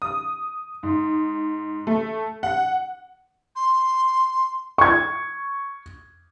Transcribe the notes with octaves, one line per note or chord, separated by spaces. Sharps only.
D#6
G#2
A3
F#5
C6
C#6 G#6